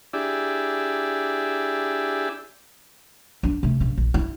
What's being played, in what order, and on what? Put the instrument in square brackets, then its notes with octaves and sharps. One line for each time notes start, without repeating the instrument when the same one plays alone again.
[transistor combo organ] D4 E4 G4 G#4 D5 E5
[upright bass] B3 D4
C3 A3
A#1 C#3
A#1
E4